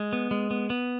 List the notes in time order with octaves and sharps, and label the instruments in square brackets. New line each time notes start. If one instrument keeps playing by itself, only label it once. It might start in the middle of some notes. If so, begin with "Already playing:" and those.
Already playing: [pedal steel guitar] G#3
B3
G#3
B3
B3